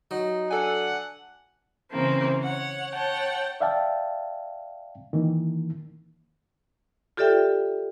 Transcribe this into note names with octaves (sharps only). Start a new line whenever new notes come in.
F#3 D#4
D4 A4 F#5 G#5
C#3 E3 A#3 C4
C#5 F#5
C#5 F#5 G5 A5
D5 E5 F5 G5 A5
D#3 E3 A#3
F4 G4 A4 D5 E5 G5